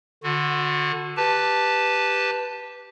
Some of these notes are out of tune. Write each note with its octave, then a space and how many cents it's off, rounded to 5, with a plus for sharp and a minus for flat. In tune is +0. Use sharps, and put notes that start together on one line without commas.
D3 +10 F#4 -35
G4 +0 B4 +0 A5 +0